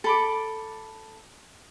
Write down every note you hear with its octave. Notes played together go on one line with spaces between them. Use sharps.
A4 B5 D6